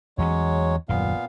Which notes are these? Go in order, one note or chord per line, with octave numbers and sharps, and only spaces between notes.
E2 E3 F#3 G#3 C#4 C#5
D#1 F#2 A#2 B3 F5